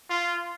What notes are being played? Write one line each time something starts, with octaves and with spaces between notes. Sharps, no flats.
F4